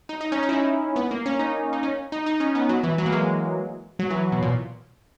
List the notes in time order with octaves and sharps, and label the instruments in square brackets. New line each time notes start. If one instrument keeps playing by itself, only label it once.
[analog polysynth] D#4
D#4
C#4
D#4
E4
D#4
B3
A#3
C#4
D#4
D#4
C#4
D#4
D#4
C#4
B3
F#3
E3
F#3
A#3
G#3
F#3
E3
B2
A#2